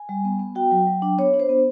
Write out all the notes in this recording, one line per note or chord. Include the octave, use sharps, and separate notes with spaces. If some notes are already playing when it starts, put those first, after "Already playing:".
Already playing: G#5
G3
B3
B3
F#4 G5
F#3
F#3
D4
B3 C#5
D4
C5
B3